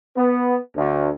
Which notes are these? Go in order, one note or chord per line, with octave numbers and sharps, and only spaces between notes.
B3
D2